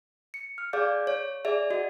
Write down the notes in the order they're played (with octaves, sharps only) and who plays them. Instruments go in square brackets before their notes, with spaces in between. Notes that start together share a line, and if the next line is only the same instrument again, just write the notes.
[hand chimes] C#7
F6
G#4 D5 F5 D6 G6
C#5
G#4 D5 E5
F#4 D#5